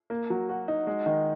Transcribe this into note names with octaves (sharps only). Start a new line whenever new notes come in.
A#3
F#3
F#4
D#4
G#3
D#3